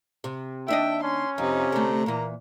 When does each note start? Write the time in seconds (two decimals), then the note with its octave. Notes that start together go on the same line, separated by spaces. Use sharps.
0.24 C3
0.68 D#2 D4 D#5 E5 G5
1.03 C#4 C6
1.38 F2 C3 D#4
1.72 D3 A3 A#5
2.06 A#2 E3 A#3